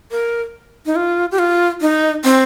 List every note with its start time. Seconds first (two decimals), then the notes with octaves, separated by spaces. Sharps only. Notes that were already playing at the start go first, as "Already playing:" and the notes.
0.11 A#4
0.86 D#4
0.96 F4
1.32 G4
1.39 F4
1.81 D#4
2.24 C4